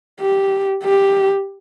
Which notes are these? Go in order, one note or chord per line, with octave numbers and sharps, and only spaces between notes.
G4
G4